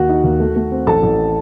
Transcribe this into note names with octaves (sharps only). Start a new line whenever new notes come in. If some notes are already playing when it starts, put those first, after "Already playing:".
Already playing: D#2 F#4 F#5
D#4
D#2
A3
A3
C4
A1 A4 A5
A1